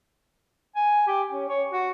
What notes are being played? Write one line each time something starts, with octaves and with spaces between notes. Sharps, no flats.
G#5
G4
C#4
C#5
F#4